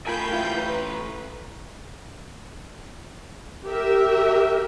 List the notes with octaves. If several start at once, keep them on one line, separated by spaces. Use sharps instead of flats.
A3 F4 A#4 G5 G#5 B5 G6
A2 E3 F4
B4 A#5
G4 A#4 E5